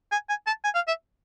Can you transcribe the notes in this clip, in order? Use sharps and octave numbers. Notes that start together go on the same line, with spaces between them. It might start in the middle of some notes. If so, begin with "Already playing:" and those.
G#5
G#5
A5
G#5
F5
E5